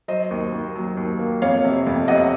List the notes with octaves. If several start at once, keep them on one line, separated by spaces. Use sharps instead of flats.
F#3 C5 D#5
D#2
D#2
F#3
D#2
A#3
F2 C#5 F5
C3
F2
C3 D#5 F#5